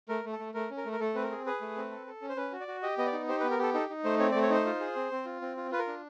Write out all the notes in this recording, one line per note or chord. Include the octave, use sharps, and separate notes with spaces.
A3 A#4
A3
A4
A3
A3 A#4
C#4
A#4
A3
A#4
A3 A4
C4 B4
A#4
G#4
G#4 B4
A3
C4
A4
A4
C#4
C5
C#4 B4
F#4
D5
F#4
G4 D#5
B3 D#5
D5
D#4
G4 C5
B4
B3
A#4
G4 A4
D#4 A4
D#4
A3 C5
C4 C#5
A3 D5
C#5
D#4 C5
F4
G#4
C4
C4
F4
C4
F4
F4 B4
A#4
D4